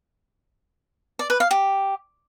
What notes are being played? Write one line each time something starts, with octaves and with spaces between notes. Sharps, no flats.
D5
B4
F5
G4